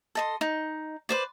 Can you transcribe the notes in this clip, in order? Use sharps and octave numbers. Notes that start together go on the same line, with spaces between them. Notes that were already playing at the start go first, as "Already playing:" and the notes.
A4 D#5 C6
D#4
B4 C5 D5